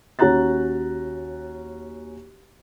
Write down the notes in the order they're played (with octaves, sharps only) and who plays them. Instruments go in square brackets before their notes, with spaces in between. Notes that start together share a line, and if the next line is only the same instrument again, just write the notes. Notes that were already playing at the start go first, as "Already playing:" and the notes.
[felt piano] D#2 C#4 F#4 A#5 F#6 A6